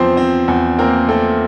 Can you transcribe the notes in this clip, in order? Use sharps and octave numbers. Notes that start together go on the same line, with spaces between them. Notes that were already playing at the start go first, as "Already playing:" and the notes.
Already playing: E2 F3 C4 C5
C4
E2
A#3 C4 A#4
A3 C4 A4